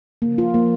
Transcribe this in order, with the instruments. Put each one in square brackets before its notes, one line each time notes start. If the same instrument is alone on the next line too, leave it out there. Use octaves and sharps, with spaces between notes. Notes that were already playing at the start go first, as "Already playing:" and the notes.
[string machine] C#3 F3 [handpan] A#3
[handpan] F4
A#3